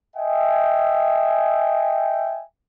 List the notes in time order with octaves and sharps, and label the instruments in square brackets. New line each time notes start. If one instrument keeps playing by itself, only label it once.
[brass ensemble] D#5 E5 G5 G#5